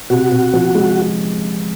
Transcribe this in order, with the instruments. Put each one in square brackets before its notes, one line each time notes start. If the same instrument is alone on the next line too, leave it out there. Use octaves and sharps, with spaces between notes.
[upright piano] C3 [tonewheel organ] F#4
[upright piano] C3
F3
G#3